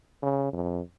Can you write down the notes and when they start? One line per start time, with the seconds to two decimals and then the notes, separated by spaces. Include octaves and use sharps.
0.23 C#3
0.53 F2